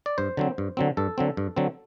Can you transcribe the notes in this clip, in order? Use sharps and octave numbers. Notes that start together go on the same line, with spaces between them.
D5
G2 C5
D3 F#3 C4
G2
D3 F#3 C4
G2 A4
D3 F#3 C4
G2
D3 F#3 C4